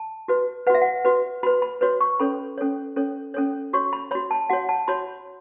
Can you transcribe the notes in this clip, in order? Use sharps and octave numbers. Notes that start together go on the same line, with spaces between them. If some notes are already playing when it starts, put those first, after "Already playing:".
Already playing: A5
F#4 B4
F#4 B4 E5 F#5
F#5
F#4 B4
F#4 B4 B5
B5
F#4 B4 C#5
C#6
C#4 A4 C#5 B5
C#4 A4 C#5
C#4 A4 C#5
C#4 A4 C#5
F#4 C#5 C#6
B5
F#4 C#5 B5
A5
F#4 C#5 F#5
A5
F#4 C#5 B5